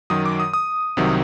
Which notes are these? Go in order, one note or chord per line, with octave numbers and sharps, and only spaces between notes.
F#2 D#3 F#3 D#6
D6
D#6
D#6
C2 C3 D#3 F#3